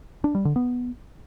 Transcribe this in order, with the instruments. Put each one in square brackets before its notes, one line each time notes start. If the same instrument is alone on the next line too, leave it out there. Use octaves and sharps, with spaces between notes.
[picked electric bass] D4
G3
D3
B3